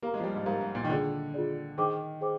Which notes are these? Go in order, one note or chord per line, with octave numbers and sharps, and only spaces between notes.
A#3 G4 A#4 F5 A#5
G#3
F3
G3
G#2
G#2 G4 A#4 F5 A#5
G#2
A#2
D#3
D3 F4 G#4 D5
F4 G#4 D5
D#3 G#4 C5 G5 D6
G#4 C5 G5 D6